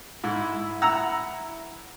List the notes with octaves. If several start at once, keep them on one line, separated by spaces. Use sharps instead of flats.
G#2 E4
F#5 A#5 E6